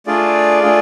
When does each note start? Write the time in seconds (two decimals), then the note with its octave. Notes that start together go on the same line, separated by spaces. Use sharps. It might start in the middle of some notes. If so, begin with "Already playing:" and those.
0.07 A3 D4 F4 G#4 D5
0.62 A3 D4 F4 G#4